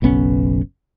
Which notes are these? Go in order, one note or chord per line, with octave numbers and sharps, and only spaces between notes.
F#1 B1 B3 C#4